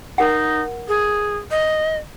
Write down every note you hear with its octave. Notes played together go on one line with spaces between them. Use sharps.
D#4 A#4 F#5
G#4
D#5